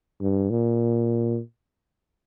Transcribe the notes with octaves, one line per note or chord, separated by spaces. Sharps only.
G2
A#2